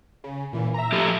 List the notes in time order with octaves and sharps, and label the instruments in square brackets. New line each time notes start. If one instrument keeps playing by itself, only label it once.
[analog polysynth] C#3
A#2 E3
E5 A#5
[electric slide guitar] F3 G4 A4